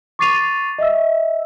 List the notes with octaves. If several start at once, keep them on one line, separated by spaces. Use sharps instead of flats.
C#6 D6 A6 C7 D#7 F7
D#5 E5 E6